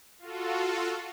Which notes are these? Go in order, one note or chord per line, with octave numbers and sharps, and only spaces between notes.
F4 F#4 A4